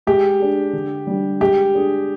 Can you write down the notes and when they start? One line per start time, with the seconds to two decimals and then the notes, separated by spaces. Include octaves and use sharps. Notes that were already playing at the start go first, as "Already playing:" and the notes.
0.07 G#3 G4
0.40 D4 G#4
0.73 D3
1.07 G3 D4 G4
1.40 G#3 G4
1.74 D4 G#4